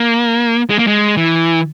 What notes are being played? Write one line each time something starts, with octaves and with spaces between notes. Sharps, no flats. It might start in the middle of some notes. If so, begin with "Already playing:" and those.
Already playing: A#3
G#3
A#3
G#3
E3